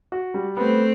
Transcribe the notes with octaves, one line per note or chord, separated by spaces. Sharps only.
F#4
G3
A3 B3 C4